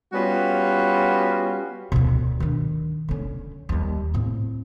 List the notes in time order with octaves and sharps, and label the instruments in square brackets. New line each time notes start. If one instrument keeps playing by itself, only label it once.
[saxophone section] G3 B3 C#4 F4 F#4
[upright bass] D2 B2
D#3 D4
D3 C#4
D#2 G3
A2 C4